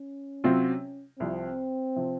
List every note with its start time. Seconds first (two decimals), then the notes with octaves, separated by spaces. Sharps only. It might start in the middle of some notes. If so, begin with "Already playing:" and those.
Already playing: C#4
0.44 C3 F#3 C4 F4
1.20 C2 C3 F3 C4
1.96 C3 F3